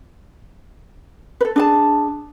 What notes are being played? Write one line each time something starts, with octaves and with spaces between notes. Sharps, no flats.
A4 B4
D4 G#4 A5